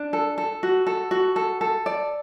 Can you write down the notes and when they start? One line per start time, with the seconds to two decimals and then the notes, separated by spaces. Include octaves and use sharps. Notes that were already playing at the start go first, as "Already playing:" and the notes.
Already playing: D4
0.13 A4
0.38 A4
0.63 F#4
0.87 A4
1.11 F#4
1.36 A4
1.61 A4
1.86 D5